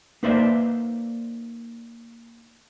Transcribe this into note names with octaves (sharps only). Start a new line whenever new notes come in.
A#3 D#4 B4 C5 D5 E5